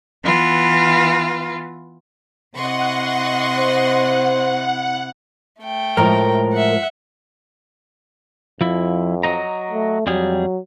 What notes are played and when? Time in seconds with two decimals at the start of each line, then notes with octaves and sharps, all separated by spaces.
0.24 E3 B3 F4
2.55 C3 E4 D#5 F#5 C6 C#6
3.59 C5
5.60 A3 G5
5.97 A2 F3 G#3 A#4 A#5
6.53 E5 F#5
8.61 F2 F3 E4
9.23 F#3 D#5 A#5
9.71 A3
10.07 F2 F#3 G3 G#4